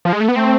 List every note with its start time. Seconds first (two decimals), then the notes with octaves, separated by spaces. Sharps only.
0.05 F3
0.13 G#3
0.20 A3
0.28 B3
0.36 A3 C4